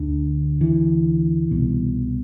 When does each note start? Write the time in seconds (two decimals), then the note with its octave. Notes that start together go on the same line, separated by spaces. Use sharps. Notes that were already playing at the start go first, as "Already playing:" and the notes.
Already playing: D2 D3
0.61 E3
1.51 C2 B2